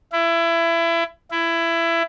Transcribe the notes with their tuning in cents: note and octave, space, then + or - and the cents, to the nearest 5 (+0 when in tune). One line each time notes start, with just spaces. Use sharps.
E4 +25
E4 +20